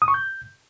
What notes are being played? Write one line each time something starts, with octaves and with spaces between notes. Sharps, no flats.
D#6
C#6
G6